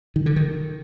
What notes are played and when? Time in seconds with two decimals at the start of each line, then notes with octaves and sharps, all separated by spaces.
0.16 D#3
0.26 D3
0.36 D#3